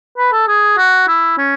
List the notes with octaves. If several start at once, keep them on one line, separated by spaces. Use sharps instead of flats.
B4
A4
G#4
F#4
E4
C#4